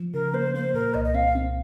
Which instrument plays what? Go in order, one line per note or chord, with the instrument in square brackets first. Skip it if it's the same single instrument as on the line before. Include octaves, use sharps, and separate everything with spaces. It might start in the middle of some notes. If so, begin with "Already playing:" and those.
Already playing: [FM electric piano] F3
[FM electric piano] C#3 [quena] A#4
[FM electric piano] A#3 [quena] C5
[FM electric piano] A#3 [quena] C5
[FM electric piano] A#2 [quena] A#4
[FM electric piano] C2 [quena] D#5
[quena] D#5
[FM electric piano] C4 [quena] F5
[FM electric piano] C4